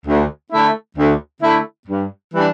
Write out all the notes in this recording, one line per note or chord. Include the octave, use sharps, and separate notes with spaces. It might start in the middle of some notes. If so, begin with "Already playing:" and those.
D2
D3 A3 E4
D2
D3 A3 E4
G2
E3 G3 D4